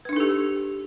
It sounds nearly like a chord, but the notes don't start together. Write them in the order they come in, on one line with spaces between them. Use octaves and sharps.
B4 D4 D#4 A4 G4